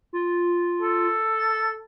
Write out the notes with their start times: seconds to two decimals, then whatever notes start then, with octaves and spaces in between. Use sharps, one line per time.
0.13 F4
0.82 A4
1.39 A6